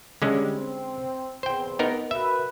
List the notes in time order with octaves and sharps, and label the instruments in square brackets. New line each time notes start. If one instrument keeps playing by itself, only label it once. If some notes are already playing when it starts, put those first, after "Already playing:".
[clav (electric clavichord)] D3 G#3 C#4 [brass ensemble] G3
[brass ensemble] C4
[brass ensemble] E2 C4 [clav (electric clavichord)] C5 G5
[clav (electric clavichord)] B3 D#4 A#4
[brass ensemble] F#4 A#4 B4 [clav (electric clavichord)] E5